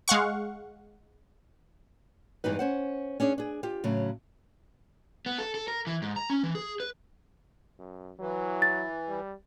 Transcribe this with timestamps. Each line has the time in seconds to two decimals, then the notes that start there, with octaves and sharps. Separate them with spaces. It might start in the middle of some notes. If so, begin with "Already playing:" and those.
0.08 G#3 F5 F#5 C#6
2.44 E2 G2 E3 G#3 D#4 B4
2.59 C#4 C5 F#5
3.20 C#4 D4 G#4 C#5
3.38 D4 G#4
3.63 F4 G4
3.84 A2 C#3 F#3
5.26 B3
5.38 A4
5.54 A4
5.68 A#4
5.87 E3
6.02 G#2
6.16 A#5
6.30 C#4
6.43 E3
6.55 G#4
6.80 B4
7.79 F#2
8.19 E3 F#3
8.62 A6
9.08 G3